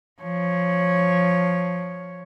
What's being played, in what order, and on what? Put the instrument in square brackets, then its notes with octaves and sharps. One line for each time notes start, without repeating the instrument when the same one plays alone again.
[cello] F3 C#5